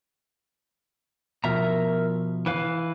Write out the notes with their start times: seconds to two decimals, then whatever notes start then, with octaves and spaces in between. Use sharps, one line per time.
1.44 B2 F3 A#4 E5 A#5
2.46 E3 B4 F5